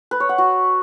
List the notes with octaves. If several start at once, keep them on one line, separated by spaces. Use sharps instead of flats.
B4
C#5
F#5
F#4